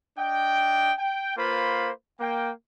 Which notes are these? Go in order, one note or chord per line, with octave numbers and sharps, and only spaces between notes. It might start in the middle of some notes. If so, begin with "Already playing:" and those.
D4 D#5 G5
G5
A#3 F4 B4 C5 B5
A#3 G5